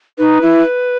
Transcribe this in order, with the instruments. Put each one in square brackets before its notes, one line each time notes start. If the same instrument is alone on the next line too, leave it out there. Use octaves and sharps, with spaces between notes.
[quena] D#4 [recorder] B4
[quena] E4